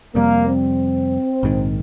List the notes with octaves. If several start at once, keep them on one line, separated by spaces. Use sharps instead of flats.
F2 C3 G3 A#3
C4
A#1 G#2 D#3